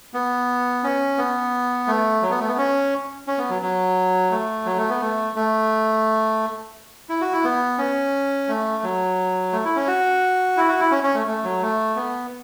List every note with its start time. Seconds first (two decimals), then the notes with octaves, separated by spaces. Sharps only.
0.14 B3
0.84 C#4
1.18 B3
1.87 A3
2.22 F#3
2.31 B3
2.40 A3
2.48 B3
2.58 C#4
3.27 C#4
3.38 B3
3.50 F#3
3.62 F#3
4.31 A3
4.65 F#3
4.78 A3
4.89 B3
5.01 A3
5.36 A3
7.09 E4
7.21 F#4
7.33 E4
7.44 B3
7.78 C#4
8.48 A3
8.83 F#3
9.52 A3
9.65 E4
9.76 C#4
9.87 F#4
10.57 E4
10.68 F#4
10.80 E4
10.91 C#4
11.04 C#4
11.14 A3
11.27 A3
11.44 F#3
11.62 A3
11.96 B3